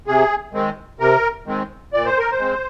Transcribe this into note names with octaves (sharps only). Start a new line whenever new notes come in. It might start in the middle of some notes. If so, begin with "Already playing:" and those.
C3 G#4
D#3 G#3 C4
C3 A#4
D#3 G#3 C4
A#2 D5
C5
A#4
C5
G#3 C4